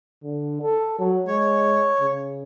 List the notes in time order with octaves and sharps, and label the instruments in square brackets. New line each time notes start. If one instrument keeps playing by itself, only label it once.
[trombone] D3
A4
F#3
[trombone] G#3 [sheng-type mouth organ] C#5
[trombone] C#3